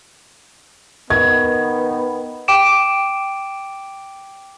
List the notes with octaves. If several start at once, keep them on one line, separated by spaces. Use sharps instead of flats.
D#3 B3 G#6
G5 D6 D7 E7